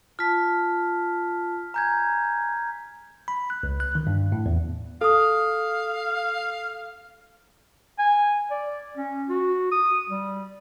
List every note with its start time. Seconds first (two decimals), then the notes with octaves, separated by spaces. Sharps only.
0.19 F4 A5 F6 B6
1.74 G#5 A#5 G6 G#6
3.28 B5
3.50 F#6
3.63 C#2
3.80 F#6
3.95 D#3
4.07 G2
4.32 A2
4.46 E2
5.01 A4 F5 D#6
7.99 G#5
8.51 D5
8.97 C#4
9.29 F#4
9.71 D#6
10.09 G3